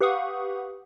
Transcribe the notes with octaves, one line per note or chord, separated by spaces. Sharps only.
G4 B4 F5 F#5 C#6 D#6